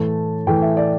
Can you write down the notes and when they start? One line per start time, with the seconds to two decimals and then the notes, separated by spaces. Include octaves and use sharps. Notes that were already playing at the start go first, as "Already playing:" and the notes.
Already playing: A2 E3 A3 A5
0.47 A2 E3 A3 G5
0.62 E5
0.77 D5